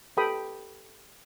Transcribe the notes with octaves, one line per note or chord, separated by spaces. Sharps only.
G4 A4 B4 G5 B5 D#6